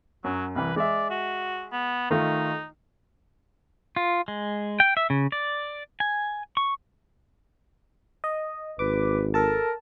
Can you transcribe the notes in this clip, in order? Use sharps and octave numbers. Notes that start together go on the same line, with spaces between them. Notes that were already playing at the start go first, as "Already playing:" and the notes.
F#2 F#3
C2 E3 B4
G#3 D5 E5
F#4
B3
D#3 A3 D#4 F4
F4
G#3
G5
E5
C#3
D5
G#5
C#6
D#5
G#1 B4 D6
A4 A#4 A5